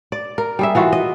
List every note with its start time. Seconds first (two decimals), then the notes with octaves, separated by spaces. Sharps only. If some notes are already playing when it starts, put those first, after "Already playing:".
0.12 D5
0.38 A#4
0.59 G3 G#4 E5
0.75 E3 F4 F#4
0.93 D#5